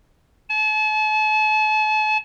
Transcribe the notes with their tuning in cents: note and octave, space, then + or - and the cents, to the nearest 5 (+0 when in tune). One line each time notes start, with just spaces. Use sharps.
A5 -40